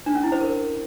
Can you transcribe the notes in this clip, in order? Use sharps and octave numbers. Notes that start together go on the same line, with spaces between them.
D4
C#4
E4
C5
A#4